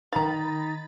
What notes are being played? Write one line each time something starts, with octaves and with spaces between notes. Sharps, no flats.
D#3 D#4 F5 A#5 B5 A6